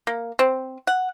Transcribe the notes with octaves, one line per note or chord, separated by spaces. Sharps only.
A#3
C4
F#5